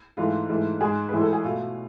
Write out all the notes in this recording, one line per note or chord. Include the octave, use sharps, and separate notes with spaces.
G#2 E3 A3 F4
G#2 E3 A3
G#2 G#3 G#4
A2 E3 G#3 B4
A4
G#4
B2 A3 F4